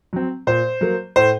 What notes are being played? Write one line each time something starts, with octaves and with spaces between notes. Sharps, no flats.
F#3 C4
A#2 C5
F#3 A#3
A2 C5